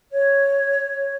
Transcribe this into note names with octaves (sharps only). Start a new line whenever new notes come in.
C#5